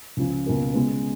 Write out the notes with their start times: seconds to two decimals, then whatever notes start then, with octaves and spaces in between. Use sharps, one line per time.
0.17 C#2 C#3 F3
0.46 C#2 B2 A#3
0.74 C#3 G#3 B3